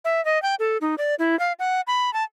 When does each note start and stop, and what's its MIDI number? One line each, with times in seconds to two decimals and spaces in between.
0.05 0.23 76
0.25 0.41 75
0.42 0.55 79
0.59 0.78 69
0.81 0.95 63
0.98 1.15 74
1.19 1.38 64
1.39 1.53 77
1.59 1.81 78
1.87 2.12 83
2.13 2.24 81